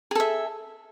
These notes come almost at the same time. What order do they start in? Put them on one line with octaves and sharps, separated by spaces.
G#4 A4 E5